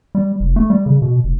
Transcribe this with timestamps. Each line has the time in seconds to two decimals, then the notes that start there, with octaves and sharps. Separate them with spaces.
0.15 G3
0.40 F1
0.56 A3
0.70 G3
0.86 C#3
1.02 B2
1.24 F1